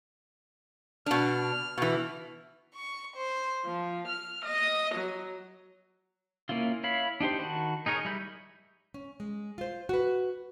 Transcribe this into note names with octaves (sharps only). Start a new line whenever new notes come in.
B2 D4 F6
B2 E3
C#6
C5
F3
F6
D#5
F#3
A#3 C#4 E4 F4
E4 C#5 F5 B5
D4 D#4 G4 C5
D#3 F#4 A5 B5
D#4 G#4 A#4 C#5
G3 E4 E5 B5 G6
C#4
G#3
F4 C5
F#4 B4